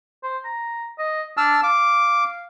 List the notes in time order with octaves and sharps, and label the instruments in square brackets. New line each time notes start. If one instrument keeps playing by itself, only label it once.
[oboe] C5
A#5
D#5
[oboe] D4 [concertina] A5 E6 F6
[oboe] F5 [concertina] D6